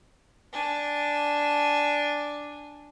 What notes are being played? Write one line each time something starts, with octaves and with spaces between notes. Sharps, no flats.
D4 G#5